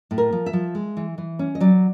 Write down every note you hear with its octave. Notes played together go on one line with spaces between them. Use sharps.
A2
A#4
F3
E5
F3
G#3
E3
E3
C#4
D#5
F#3 D5